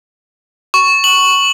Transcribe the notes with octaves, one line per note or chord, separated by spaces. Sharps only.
C#6
F#7